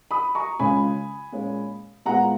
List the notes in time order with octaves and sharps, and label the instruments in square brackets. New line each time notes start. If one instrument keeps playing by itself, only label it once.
[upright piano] B5 D#6
A#5 C#6
C#2 C#3 G#3 C#4 F4 G#5 B5
A#2 G#3 C#4
A#2 G#3 B3 F4 F#5 A#5